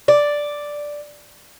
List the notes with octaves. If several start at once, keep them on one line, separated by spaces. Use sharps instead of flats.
D5